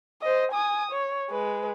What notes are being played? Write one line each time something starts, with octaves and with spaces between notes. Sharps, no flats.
C5 D#5
G#5 D#6
C#5
G#3 B4